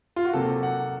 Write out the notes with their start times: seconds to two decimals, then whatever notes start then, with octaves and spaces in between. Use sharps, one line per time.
0.16 F4
0.25 F#4
0.33 C3 F#3 A#3 A4
0.63 F#5